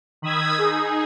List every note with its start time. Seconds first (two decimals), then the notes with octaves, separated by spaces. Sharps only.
0.22 D#3 B5 D#6 E6 G#6
0.58 D#4 G#4